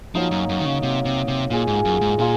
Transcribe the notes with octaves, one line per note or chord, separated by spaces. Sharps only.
F3 F#3 A#3 D#4
F#2
F#2
D#3
C#3
C3 F#3 A#3 D#4
C3
C3
A#2 A#3 F4 G#4 D#5
G#2
F#2
G#2
A#2 A#3 F4 G#4 D#5